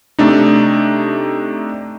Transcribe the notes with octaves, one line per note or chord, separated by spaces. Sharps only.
C3 A3 D4 D#4